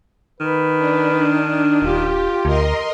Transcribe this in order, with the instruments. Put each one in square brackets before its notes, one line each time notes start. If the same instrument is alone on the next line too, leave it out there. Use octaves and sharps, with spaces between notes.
[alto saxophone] D#3 [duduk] B4
[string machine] D4
[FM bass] D#1 [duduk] F4 [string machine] G4
[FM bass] D2 [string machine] A#4 D#5 C6